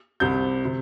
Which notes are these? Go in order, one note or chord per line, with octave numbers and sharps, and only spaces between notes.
C2 C3 G6
C3